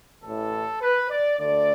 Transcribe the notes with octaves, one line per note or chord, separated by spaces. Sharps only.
A1 A2 E3 A4
B4
D5
D2 D3 A3 D5